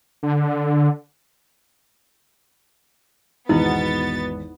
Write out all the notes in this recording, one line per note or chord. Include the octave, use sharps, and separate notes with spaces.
D3
G#1 E2 B2 B3 D#4 E4 A6